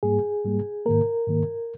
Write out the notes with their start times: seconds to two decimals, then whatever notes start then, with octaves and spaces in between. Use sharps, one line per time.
0.03 G#2 G3 A#3 G#4
0.44 G#2 G3 A#3
0.85 G#2 D#3 A#3 A#4
1.27 G#2 D#3 A#3